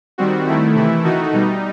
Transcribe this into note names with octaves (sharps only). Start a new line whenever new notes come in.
D#3 G3 C4 F#4
D#3 A3 E4
C3 E3 A3 E4
D#3 A3 D#4 F#4
B2 G3 D#4